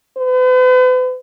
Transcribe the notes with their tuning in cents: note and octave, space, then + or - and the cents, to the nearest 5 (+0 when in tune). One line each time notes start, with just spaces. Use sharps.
B4 +45